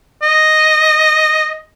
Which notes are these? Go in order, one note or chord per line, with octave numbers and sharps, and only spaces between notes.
D#5